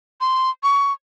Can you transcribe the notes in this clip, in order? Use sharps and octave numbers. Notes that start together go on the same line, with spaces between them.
C6
C#6